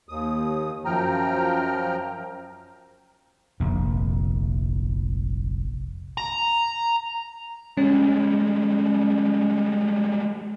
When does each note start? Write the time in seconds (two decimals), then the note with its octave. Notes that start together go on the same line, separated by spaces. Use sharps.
0.09 D#2 D#6
0.85 F#2 F3 G5 A#5 F6
3.60 F1 A#1 F2
6.18 A#5
7.77 G3 G#3 C#4